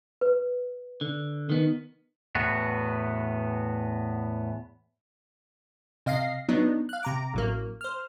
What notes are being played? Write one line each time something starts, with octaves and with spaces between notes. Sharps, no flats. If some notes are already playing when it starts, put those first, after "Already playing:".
B4
D3
D#3 B3 D#4
E2 A2 B3 F#4
C3 D#5 F5 A#6 C7
F#3 B3 D4 D#4
F5 F#6
C3 A#5 D6
A1 F#3 A#3
C5 F6